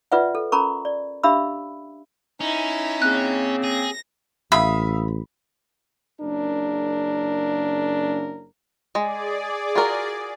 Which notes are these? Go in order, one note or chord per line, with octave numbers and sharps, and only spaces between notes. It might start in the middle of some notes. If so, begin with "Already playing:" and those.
F4 B4 D5 E5 F#5
A4
C#4 A4 A#4 A#5 B5 C#6
D5
D4 G4 E5 F5 B5 E6
C#4 D#4 E4
C#3 A#3 C4 F#6
G#4 A#6
A1 E5 F5 B5 D#6
F#1 C#3 D4 A#4
G#3 G#4 D5
F4 F#4 A#4